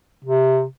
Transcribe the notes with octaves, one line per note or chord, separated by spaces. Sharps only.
C3